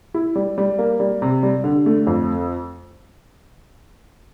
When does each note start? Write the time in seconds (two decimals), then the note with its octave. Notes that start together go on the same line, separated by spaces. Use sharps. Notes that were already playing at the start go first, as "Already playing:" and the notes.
0.14 E4
0.36 G3
0.58 G3
0.79 A#3
1.00 G3
1.22 C3
1.43 G3
1.64 D3
1.86 A3
2.07 F2